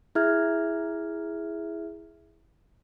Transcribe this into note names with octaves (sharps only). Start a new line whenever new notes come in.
E4 G#4 E5 F6 G#6